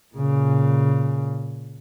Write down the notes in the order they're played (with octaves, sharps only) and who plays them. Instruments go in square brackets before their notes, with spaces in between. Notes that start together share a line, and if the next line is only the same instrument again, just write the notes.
[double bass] A#2 C#3